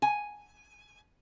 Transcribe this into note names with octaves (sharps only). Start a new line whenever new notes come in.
G#5